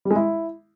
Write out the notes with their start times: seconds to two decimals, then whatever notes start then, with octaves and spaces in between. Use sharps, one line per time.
0.05 G3
0.11 G#3
0.16 E4